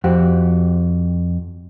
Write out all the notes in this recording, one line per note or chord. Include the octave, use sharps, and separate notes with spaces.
F2 F#4 G4